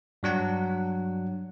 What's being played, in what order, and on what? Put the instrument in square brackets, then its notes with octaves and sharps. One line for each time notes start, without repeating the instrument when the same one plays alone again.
[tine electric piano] G2 F#3 D4 F#5